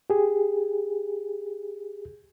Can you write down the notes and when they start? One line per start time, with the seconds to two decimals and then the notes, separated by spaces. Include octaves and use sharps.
0.10 G4 G#4